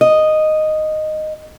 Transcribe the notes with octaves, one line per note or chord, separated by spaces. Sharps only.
D#5